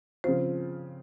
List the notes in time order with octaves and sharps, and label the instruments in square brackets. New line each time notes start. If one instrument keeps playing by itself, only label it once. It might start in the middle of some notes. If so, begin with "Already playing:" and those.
[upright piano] C#3 F3 C4 F4 [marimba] C5